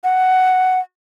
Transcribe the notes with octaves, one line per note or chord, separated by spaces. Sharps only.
F#5